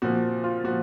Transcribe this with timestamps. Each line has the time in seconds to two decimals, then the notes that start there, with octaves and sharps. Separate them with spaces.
0.02 A#2 F3 F#4
0.44 F4
0.64 A#2 F3 F#4